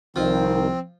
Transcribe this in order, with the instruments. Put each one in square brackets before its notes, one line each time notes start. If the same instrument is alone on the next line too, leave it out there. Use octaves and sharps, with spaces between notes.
[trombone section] C2 D#3 [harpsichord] F3 [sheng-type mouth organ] C4